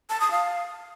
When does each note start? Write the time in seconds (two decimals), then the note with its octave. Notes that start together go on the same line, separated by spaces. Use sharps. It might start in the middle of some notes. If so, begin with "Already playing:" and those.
0.10 A5
0.20 D#6
0.31 F5